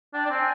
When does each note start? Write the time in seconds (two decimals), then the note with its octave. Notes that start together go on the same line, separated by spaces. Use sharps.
0.14 D4 G5
0.26 D4
0.30 C4 G#5